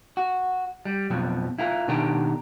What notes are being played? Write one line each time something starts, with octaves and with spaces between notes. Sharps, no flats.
F#4
G3
F2 B2 F3 F#3
E4 F4 A#4
B2 D#3 D4 G4 A#4